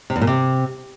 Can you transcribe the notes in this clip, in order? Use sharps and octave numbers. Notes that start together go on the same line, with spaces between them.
C3
E2
A#2
C3